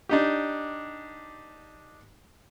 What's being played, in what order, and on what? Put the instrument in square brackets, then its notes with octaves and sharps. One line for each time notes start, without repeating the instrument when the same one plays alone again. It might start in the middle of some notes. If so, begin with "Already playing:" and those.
[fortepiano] D4 D#4 G4